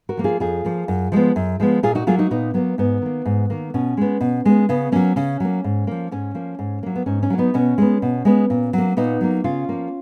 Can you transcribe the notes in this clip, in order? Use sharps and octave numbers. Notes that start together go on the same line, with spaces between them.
F#4 A#4
F3 A#3
F4 G#4
F2 F4 G#4
F3 A#3
F#2
F3 G#3 B3
F#2
F3 G#3 B3
A#2 F4 G#4
D#4 F#4
F#3 A#3 F4 G#4
D#4 F#4
A#2 B3 D#4
F#3 A#3 B3
G#2 B3
D#3 A#3
G#2
D#3 A#3
B2 C#4
G#3 B3
B2
G#3 B3
C#3 B3
F#3 A#3 C#4
C#3 C#4
F#3 A#3
G#2
F3 A#3
G#2 C#4
F3 A#3
G#2
F#3 A#3
B3
G#2 C#4
C#4
F#3 A#3
B3 D#4
B2 C#4
G#3 B3
B2
G#3 B3
A#2
F#3 A#3
A#2 B3 D#4
F#3 A#3
C#3 C#4 F4
F3 A#3